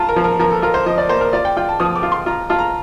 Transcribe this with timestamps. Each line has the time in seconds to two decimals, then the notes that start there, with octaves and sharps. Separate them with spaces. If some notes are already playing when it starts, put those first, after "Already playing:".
Already playing: F4 A5 A#5
0.09 A#4
0.16 F3
0.24 A#4
0.39 F3 A#4
0.51 A4
0.62 F4 A#4
0.74 C5
0.86 F3 D#5
0.98 D5
1.09 A#3 C5
1.21 A#4
1.33 F4 D5
1.45 G5
1.57 F4 G5
1.69 A5
1.80 F3 D#6
1.96 D6
2.03 F4
2.12 C6
2.26 F4 A#5
2.49 F4 A5
2.59 A#5